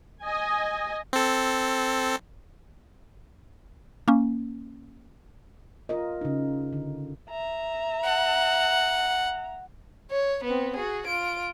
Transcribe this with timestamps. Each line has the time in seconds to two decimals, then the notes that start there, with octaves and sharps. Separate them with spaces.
0.23 D#5 G#5
1.13 C4 A4
4.08 A#3 C#4
5.89 F4 A#4 D#5
6.21 C#3 D#4
6.73 D3
7.30 E5 A#5
8.04 F#5
10.11 C#5
10.44 B3 C4
10.76 F#4 G#4
11.07 F4 D7